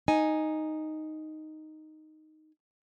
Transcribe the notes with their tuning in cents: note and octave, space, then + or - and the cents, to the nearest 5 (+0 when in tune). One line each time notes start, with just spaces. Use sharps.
D#4 +0 G#5 +0